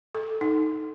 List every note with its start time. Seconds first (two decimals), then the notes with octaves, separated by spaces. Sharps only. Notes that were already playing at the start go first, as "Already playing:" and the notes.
0.15 A4
0.41 D#4